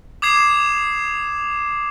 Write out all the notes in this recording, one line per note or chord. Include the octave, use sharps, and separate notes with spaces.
D6 D#6 G#6 C7 E7